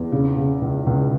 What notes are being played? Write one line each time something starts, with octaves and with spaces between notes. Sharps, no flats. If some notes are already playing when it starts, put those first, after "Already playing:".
Already playing: E2
C#3
C#3
C#2
C#2